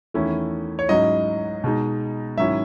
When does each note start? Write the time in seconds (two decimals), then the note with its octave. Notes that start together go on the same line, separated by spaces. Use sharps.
0.14 E2 D#3 A3 C#4 E4
0.79 C#5
0.88 G#2 F#3 C#4 E4 D#5
1.64 B2 G#3 D#4
2.38 G#2 D#3 F#3 C#4 E4 E5